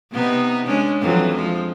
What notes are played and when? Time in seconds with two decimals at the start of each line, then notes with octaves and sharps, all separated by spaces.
0.11 C3 B3 D#4
0.67 G#3 C#4 D4
1.01 F2 E3 F#3
1.35 F3 G#3